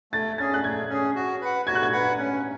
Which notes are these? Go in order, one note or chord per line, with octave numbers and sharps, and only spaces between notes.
A3 A6
C#4 G#4 A6
F#6
A3 G#6
C#4 G#4
F#4
B4 F#5
F#4 G#6
F#6
G#6
B4 F#5
C#4